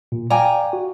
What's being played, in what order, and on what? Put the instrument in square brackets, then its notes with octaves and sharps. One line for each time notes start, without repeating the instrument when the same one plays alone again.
[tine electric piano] A#2
[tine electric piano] D5 F5 D6 [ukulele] G5 G#5 A#5
[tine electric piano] F#4